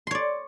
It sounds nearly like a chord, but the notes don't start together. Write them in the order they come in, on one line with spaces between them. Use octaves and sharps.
C6 C#5 D5